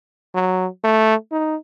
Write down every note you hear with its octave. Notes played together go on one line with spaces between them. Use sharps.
F#3
A3
D#4